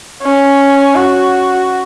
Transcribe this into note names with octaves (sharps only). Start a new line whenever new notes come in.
C#4
F#4